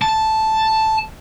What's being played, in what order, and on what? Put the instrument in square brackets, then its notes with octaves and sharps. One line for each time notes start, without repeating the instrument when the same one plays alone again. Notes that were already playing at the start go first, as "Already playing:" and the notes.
[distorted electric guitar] A5